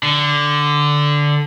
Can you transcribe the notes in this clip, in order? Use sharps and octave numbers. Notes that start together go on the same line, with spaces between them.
D3